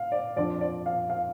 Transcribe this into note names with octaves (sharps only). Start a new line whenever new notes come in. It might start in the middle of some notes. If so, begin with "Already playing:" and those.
Already playing: F5
D5
F2 F3 D4 D5
D5
F5
F5